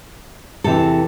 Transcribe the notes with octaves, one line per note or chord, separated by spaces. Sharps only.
E2 C3 E3 A4